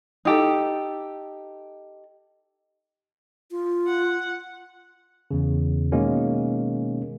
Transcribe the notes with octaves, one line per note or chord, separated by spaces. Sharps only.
D#4 G4 A4
F4
F#5
E2 C#3
B2 D#3 G#3 A#3 C#4